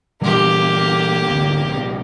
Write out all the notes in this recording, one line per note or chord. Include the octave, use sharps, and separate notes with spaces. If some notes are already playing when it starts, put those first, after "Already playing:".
A#2 E3 G3 A#3 G4
G#1 D2
A#1 C3